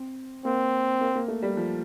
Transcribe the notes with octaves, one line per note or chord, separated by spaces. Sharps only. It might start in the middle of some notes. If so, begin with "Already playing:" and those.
Already playing: C4
A#3 C4
A#3
A#3
A3
G3
F3